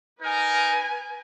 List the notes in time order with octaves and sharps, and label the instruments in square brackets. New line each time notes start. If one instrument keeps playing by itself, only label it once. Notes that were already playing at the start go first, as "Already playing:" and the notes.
[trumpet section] D#4 A#4 [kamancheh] B4 G#5